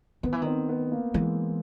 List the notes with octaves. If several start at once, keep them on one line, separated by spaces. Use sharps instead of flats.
D#3 B3
E3
D#3 C4
B3
A#3
E3 G#3